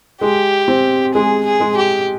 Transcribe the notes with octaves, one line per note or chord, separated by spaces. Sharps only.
G#3 G4
C4
G#3 G#4
G#4
G#3
G4